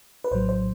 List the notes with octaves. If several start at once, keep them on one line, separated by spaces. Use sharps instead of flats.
B4
A#1 A2 F#3 C5
C5